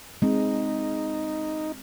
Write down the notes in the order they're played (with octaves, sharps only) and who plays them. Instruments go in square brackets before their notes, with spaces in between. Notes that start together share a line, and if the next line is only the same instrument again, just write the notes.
[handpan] G#3 C4 [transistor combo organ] D#4